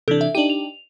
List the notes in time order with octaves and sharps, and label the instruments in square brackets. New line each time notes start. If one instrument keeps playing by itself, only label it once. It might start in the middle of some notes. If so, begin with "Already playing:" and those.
[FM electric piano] C3 E3 D4 [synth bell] A4
[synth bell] E5
[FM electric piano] D4 D#4 G4 [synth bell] D#7 F#7
[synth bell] F7